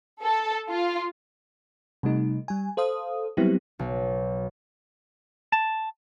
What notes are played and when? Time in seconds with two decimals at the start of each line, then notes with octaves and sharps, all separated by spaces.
0.23 A4
0.68 F4
2.03 C3 G3 A3 D#4
2.48 G3 G#5
2.77 A4 C5 F5 D#6
3.37 F#3 G3 B3 C4 E4 G4
3.79 B1
5.52 A5